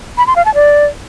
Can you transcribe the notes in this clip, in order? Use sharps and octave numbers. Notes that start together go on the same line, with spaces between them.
B5
C6
F5
A5
D5